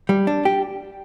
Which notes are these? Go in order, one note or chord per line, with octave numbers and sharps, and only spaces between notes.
G3
D4
G4